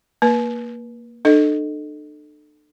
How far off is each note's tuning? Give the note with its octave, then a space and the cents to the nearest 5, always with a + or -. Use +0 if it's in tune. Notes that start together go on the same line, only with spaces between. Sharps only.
A#3 +0 B4 -30
D4 +45 A4 +0 D#5 +0